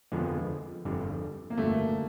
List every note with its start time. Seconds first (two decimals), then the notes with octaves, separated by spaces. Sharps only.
0.12 F2 D3 F3 G#3 B3
0.85 G1 F2 D3 G3
1.50 A#3
1.57 G1 F2 D3 G3 A3